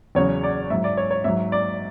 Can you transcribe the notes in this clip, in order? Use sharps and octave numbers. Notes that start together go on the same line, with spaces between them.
E2 C#3 F#3 C#5
D5
G#2 F#3 E5
D5
C#5
C#5
G#2 F#3 E5
D5